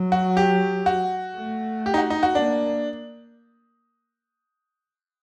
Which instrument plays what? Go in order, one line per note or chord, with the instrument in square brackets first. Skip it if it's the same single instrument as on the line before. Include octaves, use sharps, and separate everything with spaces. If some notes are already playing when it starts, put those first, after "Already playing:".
Already playing: [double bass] F#3
[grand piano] F#4
G4
F#4
[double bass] A3
[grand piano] G4
D#4
F#4
D#4
F#4
[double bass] A#3 [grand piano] D4